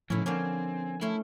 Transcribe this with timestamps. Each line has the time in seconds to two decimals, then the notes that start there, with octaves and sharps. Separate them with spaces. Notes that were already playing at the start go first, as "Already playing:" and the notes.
0.10 A2 C#3 E3 F3 C#4 E4
0.26 D3 A#3 C4 C#4 G#5
1.01 A3 C#4 E4 C6